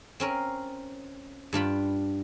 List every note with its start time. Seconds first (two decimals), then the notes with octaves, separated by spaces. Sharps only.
0.20 C4 C#4 A#4
1.53 G2 D4 F4 B5